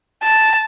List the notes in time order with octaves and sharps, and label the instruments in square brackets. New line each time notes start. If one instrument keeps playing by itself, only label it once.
[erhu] A5